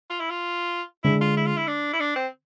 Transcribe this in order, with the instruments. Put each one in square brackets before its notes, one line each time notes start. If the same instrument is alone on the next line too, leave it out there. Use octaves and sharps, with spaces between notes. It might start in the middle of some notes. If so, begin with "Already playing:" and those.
[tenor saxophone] F4
E4
F4
[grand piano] D3 G#3 D4 G#4 [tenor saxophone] E4
[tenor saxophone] F4
E4
F4
E4
D4
E4
D4
C4